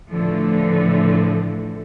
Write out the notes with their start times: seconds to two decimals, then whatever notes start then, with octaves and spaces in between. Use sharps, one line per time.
0.11 A2 D3 E3 F3 A3